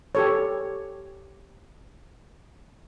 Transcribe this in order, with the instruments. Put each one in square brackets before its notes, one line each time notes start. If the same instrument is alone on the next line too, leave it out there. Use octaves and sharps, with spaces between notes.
[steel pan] G4 A4 C#5